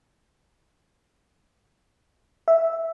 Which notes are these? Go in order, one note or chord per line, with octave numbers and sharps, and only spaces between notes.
E5